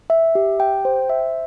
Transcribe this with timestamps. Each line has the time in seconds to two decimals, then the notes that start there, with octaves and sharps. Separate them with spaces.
0.10 E5
0.35 G4
0.60 G5
0.85 C5
1.09 E5